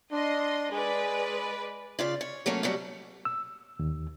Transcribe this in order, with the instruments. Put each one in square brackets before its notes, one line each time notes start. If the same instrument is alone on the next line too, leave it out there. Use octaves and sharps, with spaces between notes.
[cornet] D4 [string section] D#5 C6
[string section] G#3 B4 D5 [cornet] G#4
[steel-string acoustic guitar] C#3 F4 D5
C#5
F#3 A3 A#3 C#4
B2 F#3 G3 F#4
[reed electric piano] E6
D#2